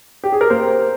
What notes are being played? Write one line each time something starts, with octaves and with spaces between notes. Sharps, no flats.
G4
G#4
A#4
A#3 C5